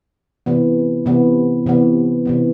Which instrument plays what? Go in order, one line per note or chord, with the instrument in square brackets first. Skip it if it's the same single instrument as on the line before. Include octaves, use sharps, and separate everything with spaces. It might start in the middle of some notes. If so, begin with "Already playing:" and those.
[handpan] C3 E3 B3
C3 E3 B3
C3 E3 B3
C3 E3 B3